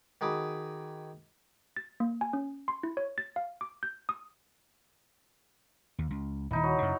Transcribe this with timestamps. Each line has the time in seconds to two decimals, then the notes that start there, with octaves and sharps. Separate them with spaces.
0.21 D#3 F#4 G#4 B5 D6
1.77 A6
2.00 A#3
2.21 G#5
2.33 C#4
2.68 C6
2.83 E4
2.97 C#5
3.18 A6
3.36 F5
3.61 D6
3.83 G6
4.09 D#6
5.99 D#2
6.11 C#2
6.51 D#1 D#2 D#4 E4
6.63 F#3
6.78 F#2 C#3